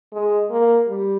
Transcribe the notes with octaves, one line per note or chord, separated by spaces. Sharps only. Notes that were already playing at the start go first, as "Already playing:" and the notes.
G#3
A#3
G3